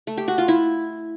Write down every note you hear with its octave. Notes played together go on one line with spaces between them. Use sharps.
A3
G4
F#4
F4
E4